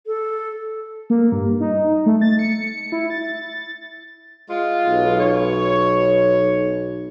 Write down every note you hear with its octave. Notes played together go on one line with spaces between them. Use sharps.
A4
A#3
G2
D#4
A3
A6
C#7
E4
A6
G#3 F4
B1
C#5